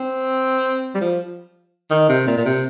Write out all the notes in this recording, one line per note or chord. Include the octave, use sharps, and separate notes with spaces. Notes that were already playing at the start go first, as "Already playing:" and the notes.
Already playing: C4
G3
F3
D#3
C3
A#2
A#2
C3